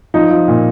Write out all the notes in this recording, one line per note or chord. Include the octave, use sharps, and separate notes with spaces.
F3 D#4
F3
A#2